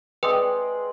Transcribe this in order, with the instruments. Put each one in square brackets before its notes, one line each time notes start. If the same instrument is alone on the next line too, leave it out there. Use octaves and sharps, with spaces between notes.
[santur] G#3 C4 D5 [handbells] B4 [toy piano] G5 D6 D#6